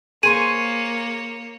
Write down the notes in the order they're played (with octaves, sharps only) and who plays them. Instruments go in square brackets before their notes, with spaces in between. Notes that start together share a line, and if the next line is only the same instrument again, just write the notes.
[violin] A#3 C#5 [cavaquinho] G#4 C5 C#6 [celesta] D#7